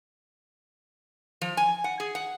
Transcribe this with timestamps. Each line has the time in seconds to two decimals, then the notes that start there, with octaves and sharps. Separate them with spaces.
1.42 F3
1.57 G#5
1.84 F#5
2.00 G#4
2.15 F#5